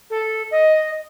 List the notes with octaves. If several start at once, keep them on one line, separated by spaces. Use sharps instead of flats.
A4
D#5